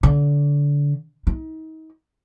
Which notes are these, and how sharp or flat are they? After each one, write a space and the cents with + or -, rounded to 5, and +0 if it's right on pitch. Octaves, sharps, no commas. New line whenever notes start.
D3 -25
D#4 +35